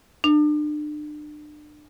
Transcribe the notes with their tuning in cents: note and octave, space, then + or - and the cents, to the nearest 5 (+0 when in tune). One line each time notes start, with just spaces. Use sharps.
D4 +35